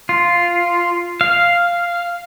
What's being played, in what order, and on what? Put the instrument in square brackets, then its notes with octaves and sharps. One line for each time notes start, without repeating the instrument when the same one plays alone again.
[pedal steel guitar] F4
F5